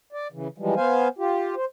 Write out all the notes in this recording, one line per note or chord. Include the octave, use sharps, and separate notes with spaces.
D5
C#3 E3
E3 F3 G3 G#3
B3 C5 F5 G#5
F4 G4
C5